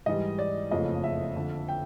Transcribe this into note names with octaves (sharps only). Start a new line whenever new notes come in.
G#2 E3 G3 D#5
D5
F#1 F2 C#3 F3 A3 D#5
E5
F2 D3 F3
G5